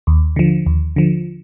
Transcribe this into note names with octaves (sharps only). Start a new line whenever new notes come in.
D#2
D3 F3
D#2
D3 F3